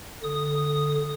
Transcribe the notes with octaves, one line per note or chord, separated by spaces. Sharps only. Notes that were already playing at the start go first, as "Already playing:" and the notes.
D3 D#6